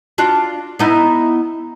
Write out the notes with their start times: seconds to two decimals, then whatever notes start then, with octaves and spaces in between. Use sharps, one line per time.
0.18 D4 F4 F#4
0.79 B3 D#4 E4